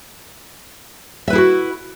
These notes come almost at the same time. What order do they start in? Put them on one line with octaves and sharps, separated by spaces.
E5 B4 E4 G#4 F#4